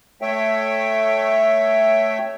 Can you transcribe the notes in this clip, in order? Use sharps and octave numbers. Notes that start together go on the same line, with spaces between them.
A3 C#5 E5 G5